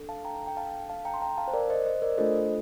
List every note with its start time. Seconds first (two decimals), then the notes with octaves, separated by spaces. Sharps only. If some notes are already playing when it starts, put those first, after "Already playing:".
Already playing: D4 A4
0.09 F5 A5
0.25 G5 A#5
0.47 G5
0.57 F5 A5
0.89 F5 A5
1.05 G5 A#5
1.14 C6
1.22 G5 A#5
1.37 F5 A5
1.48 C5
1.54 A#4 D5
1.70 C5 D#5
1.86 C5 D#5
2.02 A#4 D5
2.18 A3 D4 F4 A4 C5 D#5